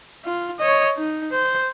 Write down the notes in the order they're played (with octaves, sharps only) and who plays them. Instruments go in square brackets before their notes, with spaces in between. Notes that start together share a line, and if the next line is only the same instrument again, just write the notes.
[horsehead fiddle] F4
C#5 D#5
D#4
C5